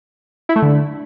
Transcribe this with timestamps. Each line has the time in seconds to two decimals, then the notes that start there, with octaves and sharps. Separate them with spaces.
0.49 E4
0.56 A3
0.62 D3